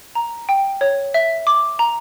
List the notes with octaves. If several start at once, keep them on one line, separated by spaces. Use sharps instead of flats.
A#5
G5
C#5
E5
D6
A#5